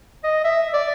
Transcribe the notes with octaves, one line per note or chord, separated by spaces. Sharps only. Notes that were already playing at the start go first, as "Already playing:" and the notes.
D#5
E5
D5